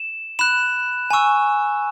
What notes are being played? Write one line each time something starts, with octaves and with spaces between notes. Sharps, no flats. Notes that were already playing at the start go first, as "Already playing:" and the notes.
Already playing: E7
B5 F#6 E7
G#5 C#6 E6